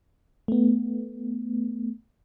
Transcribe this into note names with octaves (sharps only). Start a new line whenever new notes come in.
A3 B3